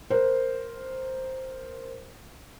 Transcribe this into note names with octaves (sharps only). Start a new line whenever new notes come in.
A#4 C5